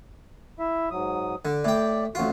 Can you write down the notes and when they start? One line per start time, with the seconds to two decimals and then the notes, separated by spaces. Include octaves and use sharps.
0.59 E4 E5
0.91 G#2 F#3 D#6
1.45 D3
1.65 A2 D5 G5
2.15 A1 F2 F4 F#4